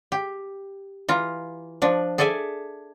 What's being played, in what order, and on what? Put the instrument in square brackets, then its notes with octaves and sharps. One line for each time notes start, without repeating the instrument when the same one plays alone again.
[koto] G4
E3 F4 A#5
F3 D4
G#4 A4 D5 E5 G#5